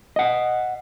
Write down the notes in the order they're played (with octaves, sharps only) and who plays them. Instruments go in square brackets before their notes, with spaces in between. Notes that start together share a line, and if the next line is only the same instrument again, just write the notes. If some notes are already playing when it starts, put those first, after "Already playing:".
[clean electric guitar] D#5 F#5